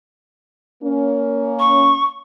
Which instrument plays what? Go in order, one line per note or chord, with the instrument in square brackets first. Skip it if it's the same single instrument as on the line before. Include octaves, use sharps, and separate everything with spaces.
[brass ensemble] A#3 C#4
[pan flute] C#6